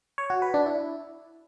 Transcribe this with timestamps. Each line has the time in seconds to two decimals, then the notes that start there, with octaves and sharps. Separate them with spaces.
0.18 C#5
0.30 F#4
0.42 B4
0.54 D4
0.66 E4